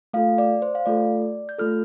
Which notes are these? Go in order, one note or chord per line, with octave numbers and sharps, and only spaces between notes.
A3 F4 A4 F5
D5
C5
F5
A3 F4 A4 D5
G6
A3 F4 A4 F6